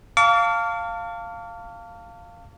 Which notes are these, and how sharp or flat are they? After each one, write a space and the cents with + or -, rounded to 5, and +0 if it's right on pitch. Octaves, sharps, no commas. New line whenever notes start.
F5 +0 A5 +35 D6 -45